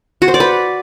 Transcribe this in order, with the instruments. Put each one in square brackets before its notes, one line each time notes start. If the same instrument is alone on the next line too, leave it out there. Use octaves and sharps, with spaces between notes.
[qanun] F#4
C5
D5
B4